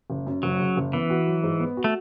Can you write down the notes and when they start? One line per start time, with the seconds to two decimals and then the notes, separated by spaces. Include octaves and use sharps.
0.10 F#1
0.27 F#2
0.43 F#1 F#3
0.60 C#3
0.77 F#1
0.93 E3 B3
1.10 F#4
1.27 F#3
1.43 G#2
1.60 B3
1.77 F#4
1.84 A3